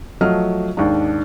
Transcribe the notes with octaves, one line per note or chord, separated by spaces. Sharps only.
F3 F#3 A3 D#5 F6
D#2 G#2 D4